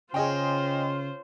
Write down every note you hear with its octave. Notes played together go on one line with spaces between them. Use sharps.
C#3 C#4 F4 G#4 C5 D#5 G5